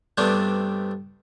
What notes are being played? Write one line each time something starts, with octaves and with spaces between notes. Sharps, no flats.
G2 C3 G3 A3 B3 D4